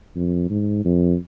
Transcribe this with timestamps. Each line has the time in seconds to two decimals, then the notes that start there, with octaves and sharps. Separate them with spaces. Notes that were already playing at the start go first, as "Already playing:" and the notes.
0.16 F2
0.50 G#2
0.85 F2